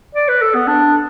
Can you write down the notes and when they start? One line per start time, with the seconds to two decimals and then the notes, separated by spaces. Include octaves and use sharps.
0.15 D5
0.29 B4
0.42 A4
0.55 B3
0.68 D4